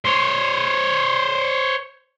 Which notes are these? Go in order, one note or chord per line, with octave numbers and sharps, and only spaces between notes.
C5 C#5